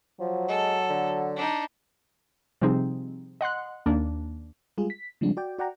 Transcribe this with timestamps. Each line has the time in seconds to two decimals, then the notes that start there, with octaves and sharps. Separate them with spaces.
0.20 F3 F#3
0.49 G#3 A4
0.89 D3
1.36 D4 D#4
2.62 C3 F3 G3 C4 D#4 G#4
3.41 D#5 F#5 C6 F#6
3.86 D#2 A#3 D4
4.78 G3 G#3 F4 G#4
4.90 B6
5.21 C#3 F3 G3 G#3 C4 D4
5.37 F#4 D5 G5
5.59 F#4 D5 F#5 G5 A#5